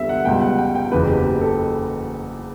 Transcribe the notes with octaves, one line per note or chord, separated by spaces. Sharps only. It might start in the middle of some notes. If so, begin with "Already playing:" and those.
Already playing: D2 D3 G3 B3 E5
F#5
C#2 B2 G3 B3 G5
F#5
G5
G5
F#1 E2 C#3 B4
G4
G4
A4